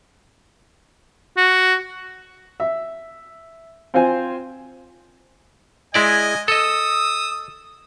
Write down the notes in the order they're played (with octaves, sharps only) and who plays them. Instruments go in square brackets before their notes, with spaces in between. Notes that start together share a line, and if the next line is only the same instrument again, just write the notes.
[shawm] F#4
[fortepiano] E5
C4 F4 C5 G#5
[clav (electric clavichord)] G#3 E4 D5 [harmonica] D#5 G#5
[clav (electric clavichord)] A4 D#5 [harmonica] D#6 E6